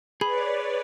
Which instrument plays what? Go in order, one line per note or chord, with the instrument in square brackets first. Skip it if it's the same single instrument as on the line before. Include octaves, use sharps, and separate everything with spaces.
[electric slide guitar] G#4 [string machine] B4 C#5 D5 [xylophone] B5